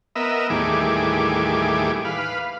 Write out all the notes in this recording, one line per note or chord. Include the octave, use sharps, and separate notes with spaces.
B3 A#4 D#5 E5
D#2 A2 E3 G3 G#4 D6
B4 F5